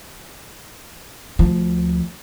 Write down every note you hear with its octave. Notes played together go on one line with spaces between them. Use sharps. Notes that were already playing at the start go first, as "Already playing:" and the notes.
D2 F3